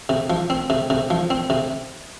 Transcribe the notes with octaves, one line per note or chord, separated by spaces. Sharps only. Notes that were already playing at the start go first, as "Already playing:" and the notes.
C3
F3
C4
C3
C3
F3
C4
C3